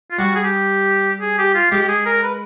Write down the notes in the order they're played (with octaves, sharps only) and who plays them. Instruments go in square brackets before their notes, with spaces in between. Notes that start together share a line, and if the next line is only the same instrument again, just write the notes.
[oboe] F4
[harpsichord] G3 [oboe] F#4
[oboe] G#4
G4
G#4
G4
F4
[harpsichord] G#3 [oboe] G4
[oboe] G4
G#4
A#4
B4